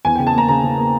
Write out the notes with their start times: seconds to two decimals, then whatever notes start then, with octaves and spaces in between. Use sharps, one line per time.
0.05 E2 G#5
0.15 G5
0.19 C#3
0.27 A5
0.34 A#3 A#5
0.48 C#3 A#5
0.63 C#3
0.78 A#3